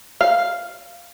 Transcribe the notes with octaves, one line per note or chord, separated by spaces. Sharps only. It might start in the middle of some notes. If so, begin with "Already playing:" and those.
F5